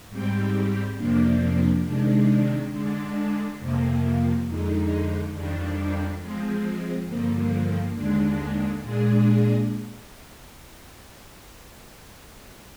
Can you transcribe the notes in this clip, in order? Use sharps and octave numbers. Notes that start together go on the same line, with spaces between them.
G#2 G3 C4 G4
F2 C3 F3 A#3 D4
C3 D#3 G#3 D4
D3 G#3 D4
F2 C3 F3 A#3
F2 D3 G#3 D#4
F2 D#3 G3 D4
F3 G#3 C4
G2 D3 F3 A#3
D#2 D3 G#3 D4
A#2 G#3 D4 G#4